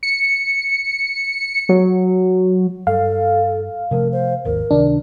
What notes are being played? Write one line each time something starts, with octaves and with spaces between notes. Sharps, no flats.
C#7
F#3
G2 A4 F5
C3 F3 A3 A#4
C5
G#1 D#2 A#4
C#2 C3 D#3 D4